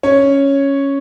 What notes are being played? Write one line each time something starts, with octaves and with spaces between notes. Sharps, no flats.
C#4 C#5